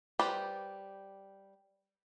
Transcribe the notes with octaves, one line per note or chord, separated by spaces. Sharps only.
G3 G4 B4 C5 D5